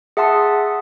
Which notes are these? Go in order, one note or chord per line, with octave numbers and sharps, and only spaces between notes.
G#4 E5 F#5 A5 C6 D#6